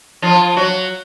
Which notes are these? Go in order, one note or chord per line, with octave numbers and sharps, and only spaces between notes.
F3 F4
F#3 F#4